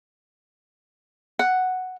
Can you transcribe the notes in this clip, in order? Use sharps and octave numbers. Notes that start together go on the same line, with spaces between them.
F#5